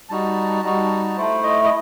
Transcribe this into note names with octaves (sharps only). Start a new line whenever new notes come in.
G3 D#4 F#4 A5
G3 D#4 F#4
A3 E4 C5
D#5
D#5